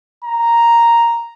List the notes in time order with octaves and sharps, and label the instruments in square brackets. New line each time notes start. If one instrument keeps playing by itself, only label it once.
[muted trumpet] A#5